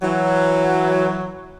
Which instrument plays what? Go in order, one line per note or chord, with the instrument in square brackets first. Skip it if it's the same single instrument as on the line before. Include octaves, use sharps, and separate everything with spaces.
[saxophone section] E3 F#3